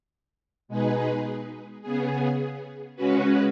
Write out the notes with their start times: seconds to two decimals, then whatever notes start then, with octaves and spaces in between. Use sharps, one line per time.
0.68 B2 G#3 D#4 G#4 B4
1.82 C#3 B3 G#4
2.96 C#3 G#3 C#4 F#4 B4